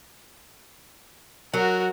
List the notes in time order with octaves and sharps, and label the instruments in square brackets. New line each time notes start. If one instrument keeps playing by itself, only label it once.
[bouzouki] F#3 [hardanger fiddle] F#4 A#4